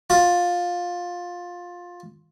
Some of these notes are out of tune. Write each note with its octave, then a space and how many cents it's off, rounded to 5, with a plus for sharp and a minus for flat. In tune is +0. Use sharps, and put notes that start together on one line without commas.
F4 +15